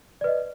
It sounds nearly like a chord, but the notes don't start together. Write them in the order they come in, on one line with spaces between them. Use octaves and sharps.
D5 B4 D#5